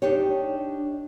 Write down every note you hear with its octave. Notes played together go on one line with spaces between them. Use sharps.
D4 D#4 G4 C#5